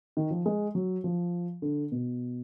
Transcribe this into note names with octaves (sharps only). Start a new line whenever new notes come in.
D#3
F3
G#3
F#3
F3
D3
B2